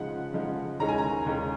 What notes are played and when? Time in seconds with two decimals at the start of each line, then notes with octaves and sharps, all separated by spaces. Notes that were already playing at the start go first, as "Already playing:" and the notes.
Already playing: C#3 F3 G#3 D#4 F#5
0.33 C#3 F3 G#3 D#4
0.79 D#2 D#3 G#3 C#4 A#5
0.89 G#5
0.98 A#5
1.26 D#2 D#3 G#3 C#4